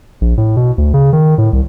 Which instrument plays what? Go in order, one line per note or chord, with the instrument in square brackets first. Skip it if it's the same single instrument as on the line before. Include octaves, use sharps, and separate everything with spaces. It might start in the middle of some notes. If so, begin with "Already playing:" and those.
[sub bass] A#1
A2
B2
D2
C#3
D#3
A2
C2